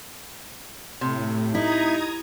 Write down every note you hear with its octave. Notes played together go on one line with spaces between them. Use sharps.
A2 C3
D#4 E4 A#5 D#6 G#6